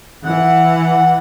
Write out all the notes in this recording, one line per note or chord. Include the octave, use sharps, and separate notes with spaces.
E3 F#5